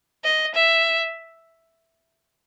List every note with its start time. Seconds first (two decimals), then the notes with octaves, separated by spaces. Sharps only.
0.24 D#5
0.55 E5